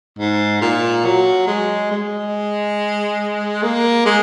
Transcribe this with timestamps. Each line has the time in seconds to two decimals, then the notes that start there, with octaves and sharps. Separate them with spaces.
0.18 G#2
0.61 A#2
1.05 F#3
1.47 G#3
1.91 G#3
3.63 A#3
4.05 G#3